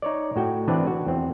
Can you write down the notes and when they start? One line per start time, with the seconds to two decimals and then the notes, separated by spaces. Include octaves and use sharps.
0.02 D#4 C#5 D5
0.36 A2 F#4 G5
0.68 E3 C4 D4 B4 D5
0.87 F#4
1.06 E2 C4